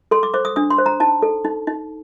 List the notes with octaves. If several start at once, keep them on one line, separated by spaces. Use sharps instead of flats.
A4 C6
D6
C5 D6
D#6
D4 D#6
C6
C5
A#5
D#4 A5
A4
D#4
D#4